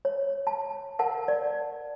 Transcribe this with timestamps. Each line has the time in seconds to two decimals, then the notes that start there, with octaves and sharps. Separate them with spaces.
0.05 C#5
0.47 A5
0.99 A#4 F#5 A5
1.28 D5